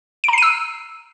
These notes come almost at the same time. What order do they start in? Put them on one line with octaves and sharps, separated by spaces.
D7 A#5 C7 D#7 E6